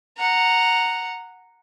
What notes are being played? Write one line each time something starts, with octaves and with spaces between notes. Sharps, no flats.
F#5 A#5